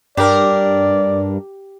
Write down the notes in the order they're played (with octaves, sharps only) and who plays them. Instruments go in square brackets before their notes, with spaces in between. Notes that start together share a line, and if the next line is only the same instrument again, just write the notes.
[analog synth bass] G2 [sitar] D4 A#4 [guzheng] G4 [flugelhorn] D5